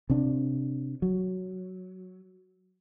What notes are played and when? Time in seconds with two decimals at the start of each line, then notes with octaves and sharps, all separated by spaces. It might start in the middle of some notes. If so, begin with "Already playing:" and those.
0.10 C3 D4
1.02 F#3